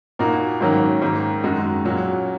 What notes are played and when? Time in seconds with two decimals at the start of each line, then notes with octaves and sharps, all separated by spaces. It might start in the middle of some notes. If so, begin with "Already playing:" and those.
0.19 A#2 A#3 D#4 F#4
0.60 G#2 D#3 F#3 A#3 C#4
1.02 G#2 D#3 A#3
1.43 F#2 D#3 G#3 D#4 F#4
1.85 A#2 F#3 C#4 F#4